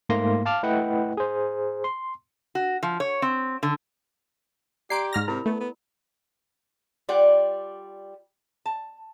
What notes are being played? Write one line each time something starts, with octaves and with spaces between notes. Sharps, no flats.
G#2 A3 A#3 C6 A#6
F5 A5 D6 F6
A3 E4 B4 D#5 F#5 G5
G#4 C5
C6
F#4
F3
C#5
C4
D3
G4 D5 A#5 C6 C7 D7
G#2 F6 A#6
C3 E4 A#4 B5
A3 B3
B3
G3 F4 D5 F#5 G5
A5